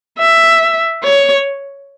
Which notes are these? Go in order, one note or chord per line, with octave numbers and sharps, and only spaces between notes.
E5
C#5